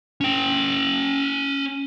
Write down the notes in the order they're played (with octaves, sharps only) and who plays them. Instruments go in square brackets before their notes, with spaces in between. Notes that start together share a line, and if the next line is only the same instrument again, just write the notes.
[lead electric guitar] C#4 G5